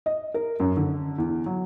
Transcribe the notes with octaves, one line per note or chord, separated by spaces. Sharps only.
D#5
A#4
F#2
D3
E2
F#3